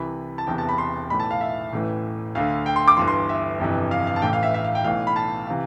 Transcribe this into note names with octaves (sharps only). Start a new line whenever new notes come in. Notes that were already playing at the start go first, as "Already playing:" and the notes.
Already playing: C2 C3 E3 B5
A5
E1 E2 C3 E3 G5
A5
B5
C6
B1 A2 E3 B5
A5
F5
E5
A1 A2 E3
D2 D3 F5
G5
C6
D6
G1 G2 E3 C6
C6
E5
G1 F2 C3 E3
F5
F5
A5
A1 A2 E3 G5
F5
E5
E5
F5
G5
B1 A2 E3 F5
B5
A5
C3 E3 F5